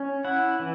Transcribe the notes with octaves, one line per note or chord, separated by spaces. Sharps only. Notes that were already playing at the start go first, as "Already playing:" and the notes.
Already playing: C#4
E4 F#5
E3